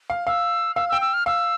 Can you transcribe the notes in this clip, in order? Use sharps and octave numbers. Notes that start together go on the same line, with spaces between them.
F5
F5 E6
F5 E6
E6
G5
E6
F6
F5 E6